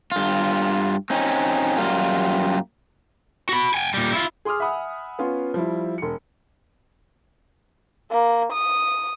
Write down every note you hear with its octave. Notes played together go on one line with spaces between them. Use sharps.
G2 F4
C4 C#4 D#4
F#2 G3 A#3 F4
F#4 B5
G5 G#5
A#2 G3
E4 F4
G#4 C6 D6 D#6 F6
E5 F#5 G#5 B5 D#6
B3 C#4 F4
F3 G3 E4
E1 C#7
A#3
D#6